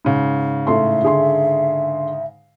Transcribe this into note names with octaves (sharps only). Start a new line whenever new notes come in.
G#2 C#3
A2 A4 E5 C6
D3 G#4 C6